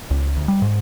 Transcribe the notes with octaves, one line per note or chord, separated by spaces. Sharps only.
C#2
D2
G3
G#2